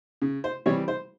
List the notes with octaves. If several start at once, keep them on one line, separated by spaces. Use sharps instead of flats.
C#3
C5
E3 G3 C4 C#5
C5